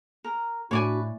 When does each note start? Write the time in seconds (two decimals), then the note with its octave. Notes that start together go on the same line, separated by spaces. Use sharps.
0.24 A#4
0.71 A2 D4 F#4 B4 C#5 D5 G#5